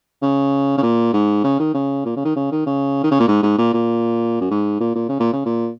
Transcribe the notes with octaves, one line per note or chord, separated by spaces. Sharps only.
C#3
C#3
A#2
G#2
C#3
D#3
C#3
A#2
C#3
D#3
C#3
D#3
C#3
D#3
C#3
A#2
G#2
G#2
A#2
A#2
F#2
G#2
A#2
A#2
C#3
A#2
C#3
A#2